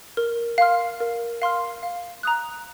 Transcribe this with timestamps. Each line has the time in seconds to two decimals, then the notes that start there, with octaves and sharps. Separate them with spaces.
0.17 A#4
0.58 F5 C6 F6
1.00 A#4
1.42 F5 C6 F6
1.83 F5
2.23 A#5 D#6 F#6